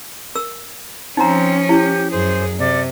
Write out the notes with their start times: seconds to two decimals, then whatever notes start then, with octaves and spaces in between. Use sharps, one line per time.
0.35 A#4 E6
1.17 F3 C4 C#4 D#4 A#5
1.69 E4 G4
2.12 F#2 G#4 C5
2.59 C3 D5